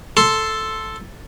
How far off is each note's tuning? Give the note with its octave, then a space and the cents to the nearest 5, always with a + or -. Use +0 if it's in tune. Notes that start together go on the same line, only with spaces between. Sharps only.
A4 +0 C6 +0